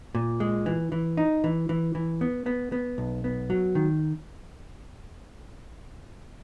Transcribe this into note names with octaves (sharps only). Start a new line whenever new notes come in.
A#2
G#3
E3
E3
D#4
E3
E3
E3
B3
B3
B3
B1
B3
F#3
D#3